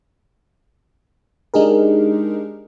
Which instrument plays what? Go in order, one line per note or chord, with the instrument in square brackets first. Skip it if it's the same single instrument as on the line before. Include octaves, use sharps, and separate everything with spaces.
[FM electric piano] G#3 D4 D#4 G4 G#4 A#4